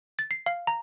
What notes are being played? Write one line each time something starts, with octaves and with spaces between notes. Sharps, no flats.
A6
C7
F5
A#5